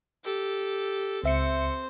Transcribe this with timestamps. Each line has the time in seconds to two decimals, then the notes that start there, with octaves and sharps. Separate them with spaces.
0.24 G4 A4
1.24 C#2 C4 C5 E5 C#7